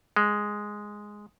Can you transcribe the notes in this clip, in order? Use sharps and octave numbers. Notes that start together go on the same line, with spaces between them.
G#3